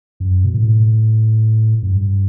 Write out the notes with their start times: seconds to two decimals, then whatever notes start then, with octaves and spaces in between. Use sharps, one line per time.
0.20 F#2
0.44 B2
0.54 A2
1.82 F#2
1.87 G2